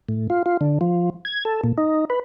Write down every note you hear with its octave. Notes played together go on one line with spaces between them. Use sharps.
A2
F4
F4
D3
F3
G#6
A4
A#2
D#4
B4